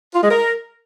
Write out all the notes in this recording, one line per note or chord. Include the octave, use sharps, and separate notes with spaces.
F4
G#3
A#4